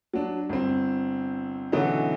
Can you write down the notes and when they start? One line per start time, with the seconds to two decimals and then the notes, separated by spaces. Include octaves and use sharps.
0.13 F#3 D4
0.49 G1 C4
1.72 B2 D3 E3 F#3 C#4 D#4